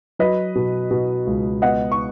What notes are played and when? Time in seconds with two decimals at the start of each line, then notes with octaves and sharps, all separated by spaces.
0.19 F#3 B4 D#5
0.55 B2
0.91 B2
1.27 C#2
1.62 B3 D#5 F#5
1.92 C#6